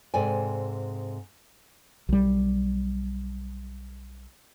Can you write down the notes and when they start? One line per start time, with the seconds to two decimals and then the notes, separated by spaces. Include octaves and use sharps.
0.14 G#2 C3 A4 D5 G5 G#5
2.09 B1 G3